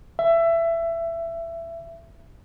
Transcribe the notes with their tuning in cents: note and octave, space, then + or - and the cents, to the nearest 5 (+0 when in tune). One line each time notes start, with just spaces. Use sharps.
E5 +20